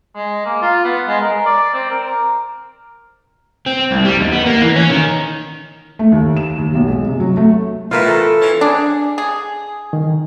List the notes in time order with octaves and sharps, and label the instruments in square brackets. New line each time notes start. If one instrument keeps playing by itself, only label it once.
[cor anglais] G#3
A#3
F4
B3
G#3
A#4
D5
C4
A#4
[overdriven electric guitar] C4
C2
G3
D#2
B3
A#3
E3
C#4
D#3
[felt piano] A3
D#2
E7
D#2
B1
G#3
C3
F#3
A3
[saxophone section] A2 E3 [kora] F4 A#4 E5
[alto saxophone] A4
[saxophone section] E3 B3 C#4
[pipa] D4 G#4
G#4
[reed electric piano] D#3